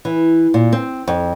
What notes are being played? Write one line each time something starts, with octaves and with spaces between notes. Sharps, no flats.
E3
A#2
C4
F2